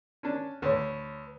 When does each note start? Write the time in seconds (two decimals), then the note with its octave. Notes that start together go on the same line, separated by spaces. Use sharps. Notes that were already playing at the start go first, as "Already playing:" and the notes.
0.23 C#4 D4
0.62 D2 B4 C#5